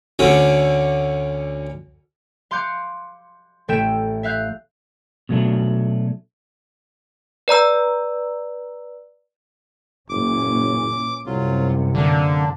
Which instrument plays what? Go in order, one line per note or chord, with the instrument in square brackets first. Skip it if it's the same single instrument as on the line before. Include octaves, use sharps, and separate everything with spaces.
[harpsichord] D2 D3 C#4
[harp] F5 C6 D6 F#6 G6 C#7
A1 A3 E5 G5 G6 E7
E5 F5 F#6 G6
[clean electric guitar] B2 F#3 A3 D4
[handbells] B4 D5 A#5 E6
[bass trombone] F#1 [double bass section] A#2 E3 C#4 [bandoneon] D6
[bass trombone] C2 [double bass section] F#2 C3 [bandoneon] F#3 F4
[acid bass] D3 [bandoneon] A#3 D4